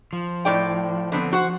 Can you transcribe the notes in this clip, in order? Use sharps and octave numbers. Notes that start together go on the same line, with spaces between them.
F3
A2 D5 G5
D3 B3 C4
F#4 C5 F#5